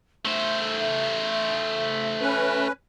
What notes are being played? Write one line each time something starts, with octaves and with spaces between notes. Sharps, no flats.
A3 C5 E5
C#4 B4